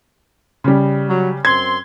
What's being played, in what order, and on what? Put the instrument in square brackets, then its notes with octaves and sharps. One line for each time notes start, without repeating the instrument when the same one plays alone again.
[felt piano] C#3 G3
[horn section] F#3
[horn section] F#2 C4 C6 [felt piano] G#6